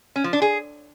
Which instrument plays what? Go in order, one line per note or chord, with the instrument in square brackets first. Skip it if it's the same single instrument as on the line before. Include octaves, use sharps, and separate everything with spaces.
[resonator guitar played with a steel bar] C#4
F3
D4
G#4